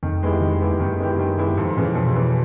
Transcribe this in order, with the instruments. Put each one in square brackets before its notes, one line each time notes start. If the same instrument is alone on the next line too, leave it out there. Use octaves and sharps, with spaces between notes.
[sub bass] F2 [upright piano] D#3
[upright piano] G#3 B3 E4 G4
D#3
G#3 B3 E4 G4
[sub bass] F#2 [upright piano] D#3
[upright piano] G#3 B3 E4 G4
D#3
G#3 B3 E4 G4
[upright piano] F2 [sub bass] G#2
[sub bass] A#2 [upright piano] C#3 E3
[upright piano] F2 [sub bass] B2
[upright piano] C#3 E3